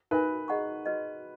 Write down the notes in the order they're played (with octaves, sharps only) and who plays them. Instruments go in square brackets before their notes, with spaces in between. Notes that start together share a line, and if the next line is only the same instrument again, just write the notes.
[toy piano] D#4 A#4 E5 G#5 [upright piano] B4
[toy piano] G#4 D#5 F#5 A#5 C#6
F#4 B4 D#5